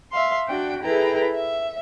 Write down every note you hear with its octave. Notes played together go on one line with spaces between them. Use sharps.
E5 F5 C6
D4 F#4 F#5 G5
E4 G#4 A4 B4 G5 A#5
E5